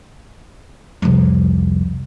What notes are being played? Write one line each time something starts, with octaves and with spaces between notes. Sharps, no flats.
C2 F2